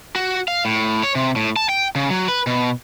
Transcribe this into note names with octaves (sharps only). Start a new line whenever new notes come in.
F#4
F5
A2
C#5
C3
A2
A5
G5
C#3
F#3
B4
B2